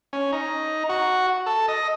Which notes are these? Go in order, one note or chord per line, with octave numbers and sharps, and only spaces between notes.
C#4
D#4
F#4
A4
D#5